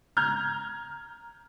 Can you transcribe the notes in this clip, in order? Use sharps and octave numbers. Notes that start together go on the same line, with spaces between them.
A#5 F6 G6 G#6